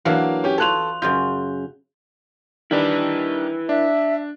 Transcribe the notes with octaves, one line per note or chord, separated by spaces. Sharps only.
E3 F#3 A#3 D4 F5 F#5
C#4 G4
F4 A4 C#5 F#6 F7
F#2 C#3 F4 G6
D#3 G3 D4 E4 B4
D4 E5